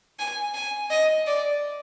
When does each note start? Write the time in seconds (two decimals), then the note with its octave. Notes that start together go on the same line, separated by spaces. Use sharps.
0.19 G#5
0.54 G#5
0.90 D#5
1.27 D5